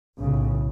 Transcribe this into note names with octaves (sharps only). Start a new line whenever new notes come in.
B1 A2 C#3